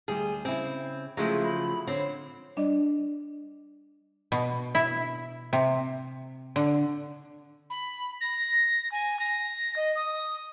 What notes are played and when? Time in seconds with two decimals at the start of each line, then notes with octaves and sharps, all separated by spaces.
0.08 D2 G3 G4 G#4
0.45 C#3 C4 E4
1.17 C#3 F3 F#3 G#3 A3 E4 G#4
1.43 B5
1.87 D3 C4 C#5
2.57 G3 D4 D5 D#5
4.32 B2
4.75 E4
5.53 C3
6.56 D3
7.70 B5
8.20 A#6
8.91 G#5
9.19 A#6
9.76 D#5
9.95 D#6